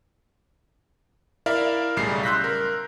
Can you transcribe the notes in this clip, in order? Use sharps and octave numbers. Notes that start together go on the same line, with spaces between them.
E4 A#4 D5 E5 F5
B1 A2 C#3 G3 C7
C6 E6 F#6 G6 A#6 B6
A#4